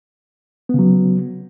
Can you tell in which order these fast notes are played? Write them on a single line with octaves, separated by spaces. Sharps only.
B3 C#3 F#3